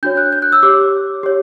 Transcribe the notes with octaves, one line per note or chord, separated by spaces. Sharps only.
D4 F#4 C#5 G6
F#6
G6
F#6
E6
G4 C#5 D6
G4 C#5